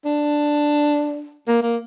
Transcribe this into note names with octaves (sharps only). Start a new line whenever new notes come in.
D4
A#3
A#3